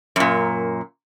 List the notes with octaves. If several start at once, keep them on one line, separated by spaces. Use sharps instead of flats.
F#2 A#2